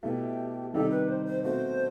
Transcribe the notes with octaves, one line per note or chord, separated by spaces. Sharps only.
B2 A3 E4 G4
C3 D#3 G3 D#4 G4 A4
B4
C5
C5
B2 A3 C4 F#4 C5